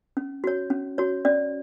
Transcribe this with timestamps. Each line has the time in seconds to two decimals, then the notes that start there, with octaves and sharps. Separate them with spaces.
0.17 C#4
0.44 F#4 C#5
0.70 C#4
0.98 F#4 C#5
1.25 C#4 D5